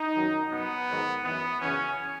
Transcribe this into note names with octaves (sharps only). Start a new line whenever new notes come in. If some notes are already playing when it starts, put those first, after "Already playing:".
Already playing: D#4
F#2 D#3 F#3
B2 F#3 B3
G#2 D#3 F#3
F#2 E3 B3
F#2 C#3 E3 C#4